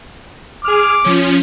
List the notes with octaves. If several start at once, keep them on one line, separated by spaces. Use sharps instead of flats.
G#4 D6 F6
F3 C#4